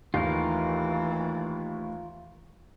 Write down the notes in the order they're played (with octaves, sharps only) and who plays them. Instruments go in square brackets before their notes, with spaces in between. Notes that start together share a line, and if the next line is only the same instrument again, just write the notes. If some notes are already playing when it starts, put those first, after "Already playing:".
[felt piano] D#2 F5 [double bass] E3 [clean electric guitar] A3 D#4 [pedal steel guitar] F4 A#4